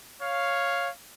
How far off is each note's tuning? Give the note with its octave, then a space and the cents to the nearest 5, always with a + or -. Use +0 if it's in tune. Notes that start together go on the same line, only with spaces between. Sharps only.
C#5 +0 F5 +0